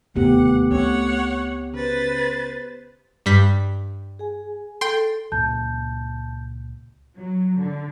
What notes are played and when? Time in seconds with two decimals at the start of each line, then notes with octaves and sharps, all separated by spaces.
0.16 E1 D#2 C3 A3 B3 G4 F#5
0.71 C#2 F3 C4 C#5 F#5
1.73 C#3 B4 C5 A6
3.26 G2 G3 B6
4.19 G#4 G#5
4.81 A4 G5 C6
5.32 C#2 A#2 A5 G6
7.16 F#3
7.58 D3